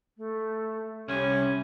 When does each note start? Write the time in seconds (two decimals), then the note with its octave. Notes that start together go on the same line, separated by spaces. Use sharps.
0.17 A3
1.08 C2 C#4 G4